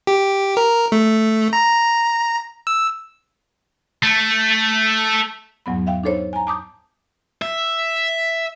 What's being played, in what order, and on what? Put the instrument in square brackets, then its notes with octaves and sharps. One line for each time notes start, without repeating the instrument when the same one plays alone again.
[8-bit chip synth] G4
A#4
A3
A#5
E6
[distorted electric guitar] A3
[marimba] E2 G#2 F#3 B3 B5
E5 F5 G5
D4 D#4 A4 C5 C#5
G#5 A#5
A5 D6 D#6 G6
[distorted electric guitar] E5